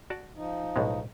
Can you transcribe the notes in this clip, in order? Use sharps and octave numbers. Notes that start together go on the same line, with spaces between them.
F#4 D5 A5
F3 D#4
B1 A2 G#3